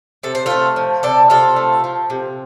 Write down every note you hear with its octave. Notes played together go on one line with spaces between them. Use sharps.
C3 A4
C5
A3 F4 A4
F3
C3 A4 D5
C3 F4 A4
A3
F3
C3